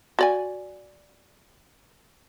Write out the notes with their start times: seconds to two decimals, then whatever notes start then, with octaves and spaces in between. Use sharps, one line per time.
0.19 F#4 D5 G#5